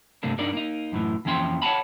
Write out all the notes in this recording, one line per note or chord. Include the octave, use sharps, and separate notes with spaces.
G2 C3 A3 A#3 D4
G2 D4 D#4 A#4 D5
A#3 D#4
F#2 A2 E3
F2 E3 A#3 C#4 G5 C6
C#5 F#5 G#5 A5 B5